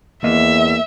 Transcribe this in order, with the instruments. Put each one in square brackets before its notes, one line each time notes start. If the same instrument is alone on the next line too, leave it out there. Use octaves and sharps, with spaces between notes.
[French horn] E2 [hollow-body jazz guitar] A#3 D#5 [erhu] E5